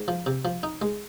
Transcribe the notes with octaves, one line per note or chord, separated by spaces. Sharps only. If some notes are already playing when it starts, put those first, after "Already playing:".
Already playing: G#2
F3
C3
F3
D#4
G#3